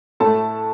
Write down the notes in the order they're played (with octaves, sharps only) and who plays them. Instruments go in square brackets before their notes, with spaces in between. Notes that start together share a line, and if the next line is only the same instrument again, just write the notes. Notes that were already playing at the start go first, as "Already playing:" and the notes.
[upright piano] A2 A3 A4 A5